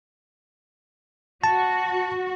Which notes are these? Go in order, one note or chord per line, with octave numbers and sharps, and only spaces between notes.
F#4 A5